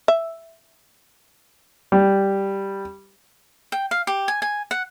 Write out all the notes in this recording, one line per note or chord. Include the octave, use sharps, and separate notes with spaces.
E5
G3
G5
F5
G4
G#5
G#5
F#5